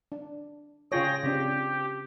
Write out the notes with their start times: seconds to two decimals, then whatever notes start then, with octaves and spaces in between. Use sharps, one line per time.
0.12 D4
0.92 C#3 F4 G#4 C#5 G5 A#6
1.23 C#3 C4 D4 G4